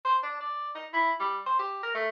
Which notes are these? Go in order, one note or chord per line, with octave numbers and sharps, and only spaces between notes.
C5
D4
D5
D#4
E4
G3
C5
G4
A#4
A3